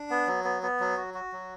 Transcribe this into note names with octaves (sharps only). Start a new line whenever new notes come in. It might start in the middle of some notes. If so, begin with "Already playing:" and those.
Already playing: D4
B3
F#3
B3
B3
F#3
F#4
F#4
F#3